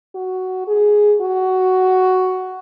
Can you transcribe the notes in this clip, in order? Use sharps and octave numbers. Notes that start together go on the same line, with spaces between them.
F#4
G#4
F#4